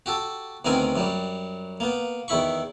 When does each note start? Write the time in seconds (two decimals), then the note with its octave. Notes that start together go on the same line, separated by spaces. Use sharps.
0.06 F#4 G4 A4
0.65 D2 D#3 B3 C4 A#4 G#5
0.96 F#2 F#3 G3
1.80 A#3 B3
2.28 E2 D#3 E4 B5 C#6